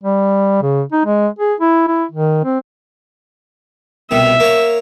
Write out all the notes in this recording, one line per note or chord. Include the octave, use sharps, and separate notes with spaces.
G3
C#3
D#4
G#3
G#4
E4
E4
D#3
C4
C2 B2 D#3 E5
A#3 C#5